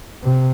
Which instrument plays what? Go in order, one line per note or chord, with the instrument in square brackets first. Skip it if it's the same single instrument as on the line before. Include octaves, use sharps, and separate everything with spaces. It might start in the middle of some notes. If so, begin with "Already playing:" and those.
[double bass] C3